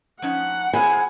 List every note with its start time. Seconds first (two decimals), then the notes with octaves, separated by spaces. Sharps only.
0.22 F3 C#4 D#4 F#5
0.73 E4 G#4 C5 G#5